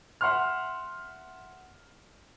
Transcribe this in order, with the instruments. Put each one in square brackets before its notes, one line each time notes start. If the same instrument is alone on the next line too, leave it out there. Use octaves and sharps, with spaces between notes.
[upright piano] E5 F#5 C6 F6